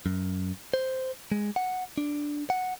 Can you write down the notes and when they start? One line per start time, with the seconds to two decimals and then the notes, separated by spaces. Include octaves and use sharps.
0.06 F#2
0.74 C5
1.32 G#3
1.56 F#5
1.98 D4
2.50 F#5